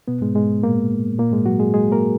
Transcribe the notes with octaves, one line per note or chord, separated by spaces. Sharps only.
B2 B3
G#2 G#3
G#2 G#3
A#2 A#3
A#2 A#3
G#2 G#3
F#3 F#4
G#3 G#4
G#3 G#4
A#3 A#4